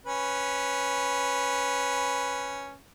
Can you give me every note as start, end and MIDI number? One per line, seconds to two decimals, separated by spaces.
0.06 2.78 61
0.06 2.78 71